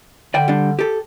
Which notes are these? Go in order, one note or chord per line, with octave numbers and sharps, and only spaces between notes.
D3 D5 G5
G3 D4
G4 A4